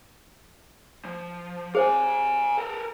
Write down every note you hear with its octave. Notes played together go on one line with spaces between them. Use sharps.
F3
G#4 C5 F5 G#5
A4 A#4